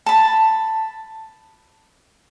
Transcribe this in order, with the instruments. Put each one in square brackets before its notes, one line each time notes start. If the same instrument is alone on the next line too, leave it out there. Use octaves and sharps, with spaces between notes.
[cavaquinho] A5 B5